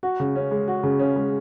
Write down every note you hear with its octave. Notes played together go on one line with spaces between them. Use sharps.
F#4
C#3
C#4
G#3
F#4
C#3
C#4
G#3